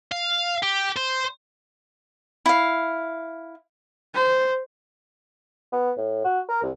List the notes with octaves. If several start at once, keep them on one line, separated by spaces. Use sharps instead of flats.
F5
G4
C5
E4 F5
C5
B3
A2
F#4
A#4
C2